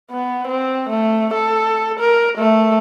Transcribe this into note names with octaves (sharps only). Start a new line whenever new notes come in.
B3
C4
A3
A4
A#4
A3